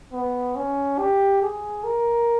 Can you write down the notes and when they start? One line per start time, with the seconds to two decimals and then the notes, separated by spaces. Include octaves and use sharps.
0.12 B3
0.56 C#4
0.99 G4
1.42 G#4
1.84 A#4